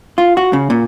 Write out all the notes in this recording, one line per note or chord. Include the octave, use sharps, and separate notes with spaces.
F4
F#4
C#3
A#2